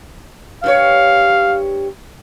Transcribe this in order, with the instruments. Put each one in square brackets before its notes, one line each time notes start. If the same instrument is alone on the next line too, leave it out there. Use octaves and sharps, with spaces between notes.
[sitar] G2 F4 C#5 [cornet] F5